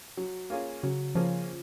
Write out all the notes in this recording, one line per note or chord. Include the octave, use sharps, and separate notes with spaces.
F#3
A#3 C#4 F4 G#4
C#3 F#3
F3 A#3 C#4 F4 G#4